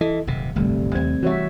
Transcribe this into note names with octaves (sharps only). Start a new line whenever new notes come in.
E3 E4 A4 D#5
D#1 C2 F#2 C3
D1 G1 C3 G3 A3
D#2 C4 G#6
E3 G3 F#4 C#5 E5